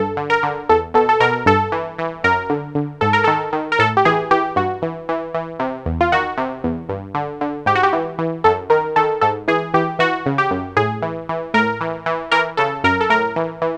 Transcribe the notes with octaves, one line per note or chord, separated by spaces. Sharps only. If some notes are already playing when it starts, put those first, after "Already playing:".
Already playing: G2 A4
D3
A#4
D3
E2 A4
B2 A4
A4
B2 A#4
G2 A4
E3
E3
F#2 A#4
D3
D3
G#2 A4
A#4
D#3 A4
D#3
A#4
A2 A4
G4
E3 G#4
E3 G4
G2 F#4
E3
E3
E3
C3
E2
F4
D#3 F#4
C3
E2
G2
D3
D3
G#2 G4
F#4
G4
E3
E3
F#2 A4
D#3 A#4
D#3 A4
G#2 A4
E3 G#4
E3 G4
E3 F#4
C#3
G4
F#2
A2 G#4
E3
E3
A2 A#4
E3
E3
E3 A#4
C#3 A4
F#2 A#4
A4
A2 A#4
E3
E3